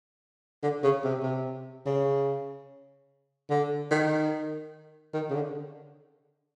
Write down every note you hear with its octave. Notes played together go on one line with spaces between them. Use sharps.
D3
C#3
C3
C3
C#3
D3
D#3
D#3
C#3
D3